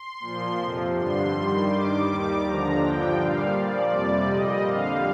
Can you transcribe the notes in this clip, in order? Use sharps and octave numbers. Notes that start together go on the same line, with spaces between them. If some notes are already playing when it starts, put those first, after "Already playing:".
Already playing: C6
A#2 F3
F2 C3 F3
G2 D3 G3 C6
G2 D#3 G3
G2 D#3 G3 D6
D#2 D#3 G3
D#2 D3 F3 A#5
G2 D3 F3 G5
A#2 G3 F5
A#2 F3 D5
F2 C3 G3
A#2 G3 D#5
F2 D3 G3 F5